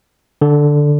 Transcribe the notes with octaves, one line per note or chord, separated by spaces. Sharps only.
D3